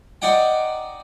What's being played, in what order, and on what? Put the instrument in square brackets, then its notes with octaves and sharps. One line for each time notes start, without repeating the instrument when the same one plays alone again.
[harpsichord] D#4 D5 F#5 G5